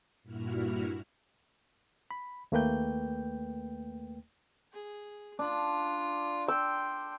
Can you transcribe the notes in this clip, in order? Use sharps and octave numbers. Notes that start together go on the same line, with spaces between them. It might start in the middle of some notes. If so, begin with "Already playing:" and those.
G2 A#2 E4 F#4 F6
B5
D#2 A3 A#3 B4 G5 G6
G#4
D4 F4
G5 C6 E6